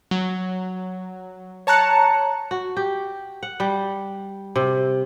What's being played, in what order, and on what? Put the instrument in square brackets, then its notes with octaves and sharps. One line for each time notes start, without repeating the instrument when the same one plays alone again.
[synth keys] F#3
C#5 A5 A#5 F#6 C#7
[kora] F#4
G4
F#5
G3
C3